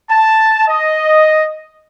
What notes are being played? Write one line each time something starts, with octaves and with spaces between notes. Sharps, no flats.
A5
D#5